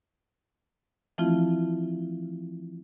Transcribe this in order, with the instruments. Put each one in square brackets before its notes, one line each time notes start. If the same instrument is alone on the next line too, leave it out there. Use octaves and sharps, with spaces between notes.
[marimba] E3 F3 A3 C4 E4 F4